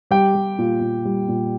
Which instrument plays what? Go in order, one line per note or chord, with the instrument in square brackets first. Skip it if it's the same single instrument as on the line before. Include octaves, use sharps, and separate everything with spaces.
[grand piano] G3 G4 G5
G3
A#2
A#2
G3
A#2